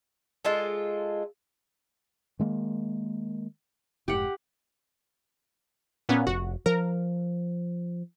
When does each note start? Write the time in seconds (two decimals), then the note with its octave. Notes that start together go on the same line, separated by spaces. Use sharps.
0.45 G#3 F4 A4
2.39 D#3 G#3 A#3
4.08 F1 G#2 G4 F#5
6.09 A#2 B3 C#4
6.27 F1 F#4
6.66 F3 A#4